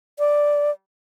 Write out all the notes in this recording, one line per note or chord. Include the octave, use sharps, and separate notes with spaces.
D5